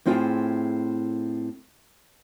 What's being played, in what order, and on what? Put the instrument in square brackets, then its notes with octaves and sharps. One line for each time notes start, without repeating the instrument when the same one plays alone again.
[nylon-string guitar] A2 C4 E4 F4 G4 G#4